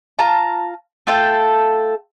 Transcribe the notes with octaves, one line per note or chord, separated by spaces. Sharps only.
F4 A5 A#5
A3 F4 A4 G5